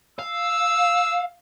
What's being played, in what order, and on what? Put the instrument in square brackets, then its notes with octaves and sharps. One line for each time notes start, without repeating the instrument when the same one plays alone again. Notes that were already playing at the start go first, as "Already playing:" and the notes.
[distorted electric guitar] F5 [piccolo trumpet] E6